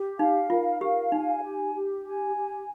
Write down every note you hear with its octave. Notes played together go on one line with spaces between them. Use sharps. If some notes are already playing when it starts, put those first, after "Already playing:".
Already playing: G4
D#4 F5
F4 A#4
G4 F5
D#4 G#5
G4
G4
G#5
G4